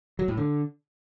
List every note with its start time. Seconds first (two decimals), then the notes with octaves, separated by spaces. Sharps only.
0.19 F#3
0.28 A2
0.37 D3